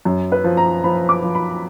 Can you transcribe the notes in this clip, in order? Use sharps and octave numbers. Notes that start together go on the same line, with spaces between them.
F#2
B4
F3
A#5
F3 B5
D6
F3
B5